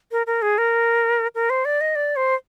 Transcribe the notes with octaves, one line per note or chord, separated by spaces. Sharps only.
A#4
A#4
G#4
A#4
A#4
C5
D5
D#5
D5
C5